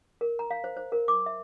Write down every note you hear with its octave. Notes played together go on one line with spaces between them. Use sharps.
A#4
A#5
F5
C5
C5
A#4
D6
E5